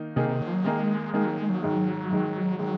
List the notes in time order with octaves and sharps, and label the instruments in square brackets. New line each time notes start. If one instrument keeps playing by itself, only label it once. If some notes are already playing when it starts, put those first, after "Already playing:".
Already playing: [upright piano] D#3 A#3 D#4
[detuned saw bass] C3 [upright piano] D#3 A#3 D#4 G#4
[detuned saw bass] C3
F#3
F3
F#3
[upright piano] D#3 A#3 D#4 G#4 [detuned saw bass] G#3
[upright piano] D#3 A#3 D#4 G#4 [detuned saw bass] G#3
[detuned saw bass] F#3
G#3
F#3
[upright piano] G#2 D#3 G#3
G#2 D#3 G#3
[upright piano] D#3 G#3 [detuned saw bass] F#3